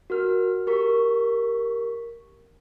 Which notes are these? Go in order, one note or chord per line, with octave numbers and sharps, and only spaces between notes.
F#4 A#4 F6
G4 A#4 C#6 B6